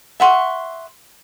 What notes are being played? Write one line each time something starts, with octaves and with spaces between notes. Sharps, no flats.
E5 F#5 C6 C#6